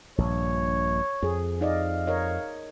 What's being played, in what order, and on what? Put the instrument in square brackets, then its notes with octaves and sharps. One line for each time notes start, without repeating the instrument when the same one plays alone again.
[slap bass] A#1 G2 [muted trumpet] C#5
[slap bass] F2 [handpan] G#4
[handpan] D#4 D5 D#5 [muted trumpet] F5
[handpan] A#4 C#5 D#5